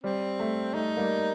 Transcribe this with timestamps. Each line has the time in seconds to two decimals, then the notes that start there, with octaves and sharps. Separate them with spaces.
0.04 G3 C4
0.39 A3
0.74 A3 D#4
0.97 G3 A#3